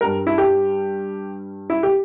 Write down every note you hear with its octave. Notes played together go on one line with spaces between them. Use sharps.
G2 G3 A#4
E4
G4
E4
G4